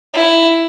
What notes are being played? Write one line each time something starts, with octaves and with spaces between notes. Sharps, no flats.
E4